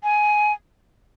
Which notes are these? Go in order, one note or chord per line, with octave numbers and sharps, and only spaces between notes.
G#5